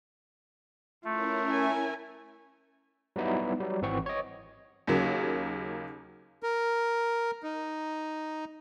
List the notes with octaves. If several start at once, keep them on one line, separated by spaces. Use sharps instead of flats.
A3 C#4 E4 F4 A#4
E5 G#5
F#3 G3 B3 D#4 E4
F#3 G3
G#1 E3 C4 F#5 C#6
C#5 D#5
D#2 C#3 F#3 A#3
A#4
D#4